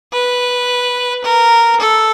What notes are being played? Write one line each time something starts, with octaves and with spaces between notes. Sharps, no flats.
B4
A#4
A4